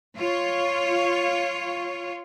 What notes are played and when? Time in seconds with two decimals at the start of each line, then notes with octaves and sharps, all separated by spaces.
0.16 F4 C#5